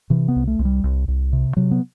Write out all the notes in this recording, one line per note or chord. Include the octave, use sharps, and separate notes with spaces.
C3 E3
B3
C2
A3
C2
G3
C2
C2
C3
C3 F#3
B3